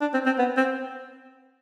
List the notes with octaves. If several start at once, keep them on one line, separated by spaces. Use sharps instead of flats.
D4
C4
C4
B3
C4